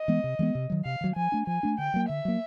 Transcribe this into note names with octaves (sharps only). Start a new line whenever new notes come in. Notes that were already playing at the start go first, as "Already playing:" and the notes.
Already playing: D#5
E3 G#3 B3
C3
E3 G#3 B3
C3
D#3 F#3
C3 F5
D#3 F#3
F3 G#5
A3 D4
F3 G#5
A3 D4
D3 G5
F#3 A#3
D3 E5
F#3 A#3